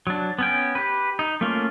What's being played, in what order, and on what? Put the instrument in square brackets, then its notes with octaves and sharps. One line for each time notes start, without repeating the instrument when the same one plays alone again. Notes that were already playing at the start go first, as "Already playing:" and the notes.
[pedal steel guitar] F#3 D4
B3 C#4 G5
G4 B4
D#4
A3 A#3 C#4 F4